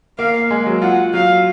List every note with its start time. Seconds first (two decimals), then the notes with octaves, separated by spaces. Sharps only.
0.18 A#3 F5
0.51 G#3
0.66 F#3
0.82 F4 F#5
1.14 F#3 F5